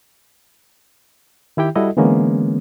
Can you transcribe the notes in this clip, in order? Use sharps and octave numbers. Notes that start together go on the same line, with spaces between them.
D#3 E4 G4 G5
G3 E4 F#4 A4 D#5
D3 E3 G#3 A#3 B3 C#4